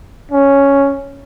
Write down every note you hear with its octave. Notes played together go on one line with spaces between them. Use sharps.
C#4